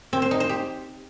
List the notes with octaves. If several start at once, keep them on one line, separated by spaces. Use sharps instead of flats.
C4
C5
D#4
C5
G4